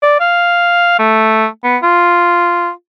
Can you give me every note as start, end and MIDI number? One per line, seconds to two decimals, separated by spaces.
0.03 0.15 74
0.20 0.98 77
0.99 1.46 57
1.64 1.77 59
1.83 2.70 65